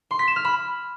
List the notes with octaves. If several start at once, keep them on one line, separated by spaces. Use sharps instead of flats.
C6
B6
E7
F6
B5